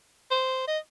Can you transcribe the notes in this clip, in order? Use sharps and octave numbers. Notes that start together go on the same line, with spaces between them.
C5
D#5